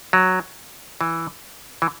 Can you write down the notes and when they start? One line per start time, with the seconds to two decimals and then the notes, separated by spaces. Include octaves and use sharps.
0.13 F#3
1.01 E3
1.82 E3